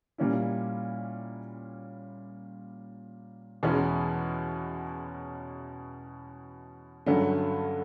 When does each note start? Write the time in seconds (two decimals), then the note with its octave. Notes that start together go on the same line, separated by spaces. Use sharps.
0.18 A#2 G3 A#3 C#4 E4
3.63 E2 B2 G#3 C#4 E4
7.06 G2 D3 F#3 A3 C#4